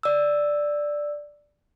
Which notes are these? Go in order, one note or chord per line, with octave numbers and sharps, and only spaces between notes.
D5 E6